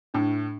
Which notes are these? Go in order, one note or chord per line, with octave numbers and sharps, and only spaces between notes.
A2 D4